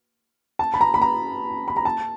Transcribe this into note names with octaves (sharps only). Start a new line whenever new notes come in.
A5
B5
A#5
B5
A#5
B5
A#5
A5